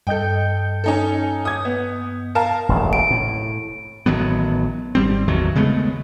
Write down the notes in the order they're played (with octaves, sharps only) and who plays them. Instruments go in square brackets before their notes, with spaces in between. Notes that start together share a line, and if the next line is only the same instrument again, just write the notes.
[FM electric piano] G2 D#5 G6 [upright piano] A4 G5
[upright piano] C#4 D#4 A4
D#6 G#6
B3
A#4 F5 A5
[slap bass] E1 A1 D#2
[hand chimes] D7
[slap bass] A2
[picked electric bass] A1 D#3 F#3 B3
G#1 G3 C4
A1 E2 D#3 F#3
C#3 G#3 A3 B3